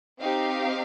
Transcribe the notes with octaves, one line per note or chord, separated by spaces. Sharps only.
C4 D#4 G4 F5